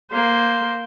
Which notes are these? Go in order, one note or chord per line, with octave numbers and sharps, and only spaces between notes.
A#3 C5